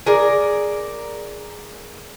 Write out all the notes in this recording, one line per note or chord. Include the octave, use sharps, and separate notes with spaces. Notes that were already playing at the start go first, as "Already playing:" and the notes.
G#4 A#4 D5